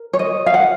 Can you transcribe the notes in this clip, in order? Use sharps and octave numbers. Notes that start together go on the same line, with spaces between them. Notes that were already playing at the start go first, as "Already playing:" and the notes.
Already playing: A#4
C#5
D#5
F5
F#5